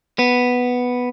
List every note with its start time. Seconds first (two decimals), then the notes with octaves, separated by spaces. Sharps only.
0.19 B3